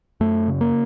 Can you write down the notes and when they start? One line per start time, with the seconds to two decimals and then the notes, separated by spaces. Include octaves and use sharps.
0.20 F#2 A3
0.48 C#3
0.61 A#3